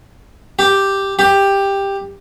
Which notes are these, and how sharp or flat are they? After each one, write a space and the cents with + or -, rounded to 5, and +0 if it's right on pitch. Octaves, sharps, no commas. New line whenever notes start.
G4 +0
G4 +10